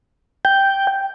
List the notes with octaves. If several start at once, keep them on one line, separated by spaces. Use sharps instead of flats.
G5